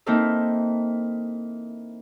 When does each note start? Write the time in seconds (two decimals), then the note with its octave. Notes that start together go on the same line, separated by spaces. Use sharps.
0.06 E3 A#3 C4 D#4 E4 A4